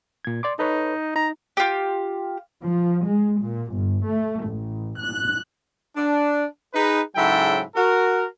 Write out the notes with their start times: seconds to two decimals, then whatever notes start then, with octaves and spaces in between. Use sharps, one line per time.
0.25 A#2 G#6
0.43 D5 C6 D6
0.59 D#4 A4 B4 C#5
1.16 D#4 A#5
1.57 F4 G4
2.62 F3
3.06 G#3
3.41 A#2
3.74 G1
4.07 A3
4.47 A1
5.00 F#6
5.97 D4
6.74 D#4 G#4 B4
7.16 G#2 C#3 F#3 E4 A4 G5
7.76 F#4 A#4